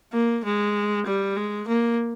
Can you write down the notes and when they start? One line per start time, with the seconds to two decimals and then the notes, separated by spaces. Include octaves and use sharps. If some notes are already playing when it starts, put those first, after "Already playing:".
0.13 A#3
0.44 G#3
1.06 G3
1.36 G#3
1.67 A#3